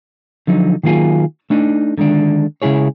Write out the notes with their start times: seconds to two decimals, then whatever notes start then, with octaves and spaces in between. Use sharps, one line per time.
0.47 D3 F3 F#3 D#4
0.83 D#3 F#3 A#3 F4 G#4
1.50 A3 D4 D#4
1.98 D3 D#3 G#3 D4
2.62 C#3 G#3 E4 G#4 C#5